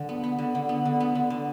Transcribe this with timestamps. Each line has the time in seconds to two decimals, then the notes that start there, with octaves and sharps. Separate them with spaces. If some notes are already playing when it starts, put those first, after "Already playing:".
Already playing: D3
0.09 B3
0.24 B3
0.39 D3
0.55 D3
0.69 B3
0.85 D3
1.00 B3
1.15 D3
1.30 D3